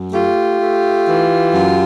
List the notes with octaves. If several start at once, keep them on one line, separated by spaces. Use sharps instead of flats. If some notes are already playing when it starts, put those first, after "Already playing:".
Already playing: F#2
A3 F4 G4
A3
E3
F#2